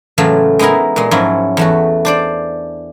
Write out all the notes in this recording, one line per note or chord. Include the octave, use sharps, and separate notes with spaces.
A2 C#3 E3 F#3 A3 F4
G#3 B3 D#4 E4 A#4
A#2 G#3
G#2 F3 F#3 C#4 E4
E2 A3 F#4
D4 C5 D5